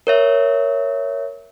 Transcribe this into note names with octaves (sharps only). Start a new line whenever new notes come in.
A#4 C#5 E5